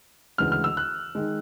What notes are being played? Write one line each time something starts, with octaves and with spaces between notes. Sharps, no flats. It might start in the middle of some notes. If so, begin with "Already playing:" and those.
D2 C#3 E3 G#3 F6
F6
E6
F#6
D#3 G#3